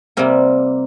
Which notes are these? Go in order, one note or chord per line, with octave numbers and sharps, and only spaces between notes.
C3 G3 A#3 C4